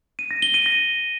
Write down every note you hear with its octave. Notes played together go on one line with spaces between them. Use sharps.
D#7
A#6
G7
D#7
A#6